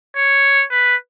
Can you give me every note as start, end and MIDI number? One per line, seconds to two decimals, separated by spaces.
0.16 0.64 73
0.71 0.95 71